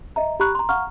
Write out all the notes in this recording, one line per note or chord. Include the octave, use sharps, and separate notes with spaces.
D#5 E5 A#5
G4 A#5 B5 C#6 F#6
A#5 C6
F5 F#5 A#5 C#6 F6